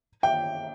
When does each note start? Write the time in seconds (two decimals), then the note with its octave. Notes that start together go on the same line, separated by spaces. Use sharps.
0.23 G5